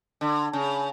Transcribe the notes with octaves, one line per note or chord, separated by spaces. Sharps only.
D3
C#3